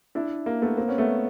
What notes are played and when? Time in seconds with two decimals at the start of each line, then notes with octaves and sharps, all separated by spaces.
0.15 D4 E4
0.46 A#3
0.62 A3 B3
0.77 A#3 C4
0.88 B3 C#4
0.98 A3 B3